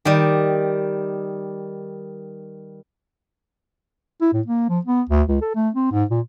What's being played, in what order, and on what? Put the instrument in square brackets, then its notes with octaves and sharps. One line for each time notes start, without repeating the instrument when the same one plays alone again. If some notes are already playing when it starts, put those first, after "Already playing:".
[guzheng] D#3 G3
[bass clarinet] E4
A2
A#3
F3
B3
D2
C#2
A4
A3
C4
G#2
A#2